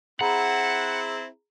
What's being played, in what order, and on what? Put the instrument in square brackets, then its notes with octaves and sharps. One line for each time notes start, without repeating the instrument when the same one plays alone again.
[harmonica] C4 E4 [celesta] G#4 A#5 B5 [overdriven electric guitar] F#5